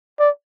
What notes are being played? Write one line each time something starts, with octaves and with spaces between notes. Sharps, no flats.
D5